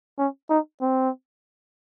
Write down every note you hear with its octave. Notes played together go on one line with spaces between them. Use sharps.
C#4
D#4
C4